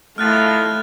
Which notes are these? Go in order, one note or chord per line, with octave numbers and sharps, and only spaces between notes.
A2 D#3 A3 E4 F4 F6 F#6 A6